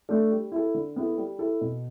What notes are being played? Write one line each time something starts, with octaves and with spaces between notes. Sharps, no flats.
A3 D4 A4
G3
E4 A4
D3
B3 E4 A4
G3
E4 A4
B2